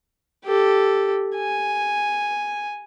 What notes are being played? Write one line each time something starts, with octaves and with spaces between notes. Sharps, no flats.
G4 A4
G#5